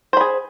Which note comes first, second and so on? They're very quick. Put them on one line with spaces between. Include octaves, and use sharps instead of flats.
C5 B5 G#4